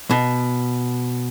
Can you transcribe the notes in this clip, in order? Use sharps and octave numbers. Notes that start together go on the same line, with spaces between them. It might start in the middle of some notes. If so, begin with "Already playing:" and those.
B2